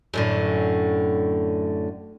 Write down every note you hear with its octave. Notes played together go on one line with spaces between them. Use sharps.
F#2 A2 D3